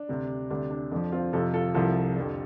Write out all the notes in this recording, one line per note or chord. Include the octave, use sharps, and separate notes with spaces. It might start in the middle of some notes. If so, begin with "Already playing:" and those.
Already playing: D4
D2 C3 G3
D2 C3 G3 D4
D4
F2 F3 D4
C4 F4
F2 C3 F3 F4 A4
F4 A4
C2 C3 F3 F4 A4
F2 D3 G3